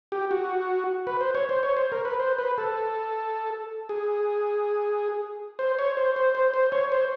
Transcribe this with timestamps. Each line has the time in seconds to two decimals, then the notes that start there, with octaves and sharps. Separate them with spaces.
0.12 G4
0.31 F#4
1.07 B4
1.21 C5
1.35 C#5
1.49 C5
1.63 C#5
1.77 C5
1.92 A#4
2.05 B4
2.19 C5
2.38 B4
2.58 A4
3.89 G#4
5.59 C5
5.79 C#5
5.97 C5
6.16 C5
6.35 C5
6.54 C5
6.72 C#5
6.92 C5